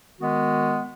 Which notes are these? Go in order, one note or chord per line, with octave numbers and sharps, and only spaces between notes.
D#3 G#3 B3 F#4